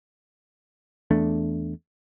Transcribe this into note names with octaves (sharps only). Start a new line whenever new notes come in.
E2 A3 D4